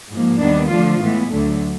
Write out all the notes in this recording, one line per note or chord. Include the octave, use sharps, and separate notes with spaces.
G#2 F3 A#3
D#2 D#3 G3 B3 D4
D3 F3 A3 D4 F4
A2 E3 G#3 B3
D2 D3 F#3 A3